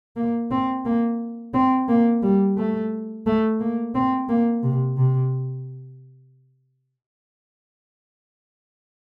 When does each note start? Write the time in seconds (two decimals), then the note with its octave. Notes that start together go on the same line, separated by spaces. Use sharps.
0.17 A#3
0.51 C4
0.85 A#3
1.54 C4
1.89 A#3
2.23 G3
2.57 A3
3.26 A3
3.60 A#3
3.94 C4
4.29 A#3
4.63 C3
4.97 C3